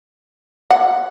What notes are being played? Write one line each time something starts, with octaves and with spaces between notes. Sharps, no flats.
F#5